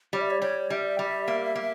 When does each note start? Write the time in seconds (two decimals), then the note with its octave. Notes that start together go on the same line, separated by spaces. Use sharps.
0.13 G3 C#5
0.21 E5
0.30 C#5
0.42 G3 C#5
0.70 G3 E5
0.99 G3
1.28 A#3
1.55 A#3